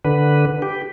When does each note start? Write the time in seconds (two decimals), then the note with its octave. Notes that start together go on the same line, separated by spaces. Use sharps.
0.05 D3 B4
0.62 G4